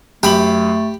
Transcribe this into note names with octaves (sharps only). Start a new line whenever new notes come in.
F#2 A3 G4 B5 F#7